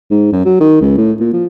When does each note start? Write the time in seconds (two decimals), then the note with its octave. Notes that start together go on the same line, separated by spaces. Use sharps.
0.11 G#2
0.32 F#2
0.45 F#3
0.61 D#3
0.82 C#2
0.98 A2
1.20 A#2
1.33 F3